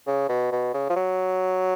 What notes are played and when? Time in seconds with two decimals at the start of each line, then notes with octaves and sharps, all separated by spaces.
0.07 C#3
0.29 B2
0.52 B2
0.74 C#3
0.90 F3
0.96 F#3